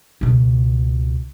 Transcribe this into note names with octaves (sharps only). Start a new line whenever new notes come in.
C#2 B2